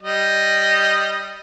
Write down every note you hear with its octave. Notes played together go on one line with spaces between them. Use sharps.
G3 D#5